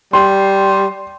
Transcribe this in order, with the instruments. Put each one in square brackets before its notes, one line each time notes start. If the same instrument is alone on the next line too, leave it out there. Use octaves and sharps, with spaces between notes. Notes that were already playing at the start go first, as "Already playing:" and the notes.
[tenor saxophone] G3 [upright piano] C6